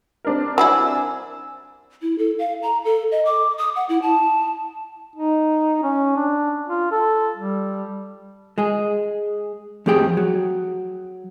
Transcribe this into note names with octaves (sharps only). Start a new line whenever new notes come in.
C4 D4 A#4
F#3 G3 E4 G#5 E6
E4
A4
F5
A#5
A4
D#5
D6
D#6
F#5
E4
A5
D#4
C#4
D4
F4
A4
G3
G#3 G#4
F2 A3 G4 G#4 G5
F#3